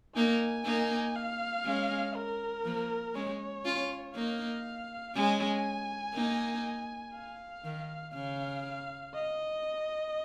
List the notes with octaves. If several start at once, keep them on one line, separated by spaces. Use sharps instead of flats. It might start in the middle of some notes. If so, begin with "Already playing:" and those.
A#3 D#4 G#5
A#3 D#4
F5
G#3 C#4
A#4
F3 A#3
G#3 C#4 C#5
C#4 F4
A#3 D#4 F5
G#3 C#4 G#5
A#3 D#4
F5
D#3
C#3 F5
D#5